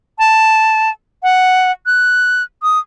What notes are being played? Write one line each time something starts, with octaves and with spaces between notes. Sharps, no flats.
A5
F#5
F#6
D#6